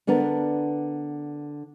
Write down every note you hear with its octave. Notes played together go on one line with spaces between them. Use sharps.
D3 B3 D4 A#4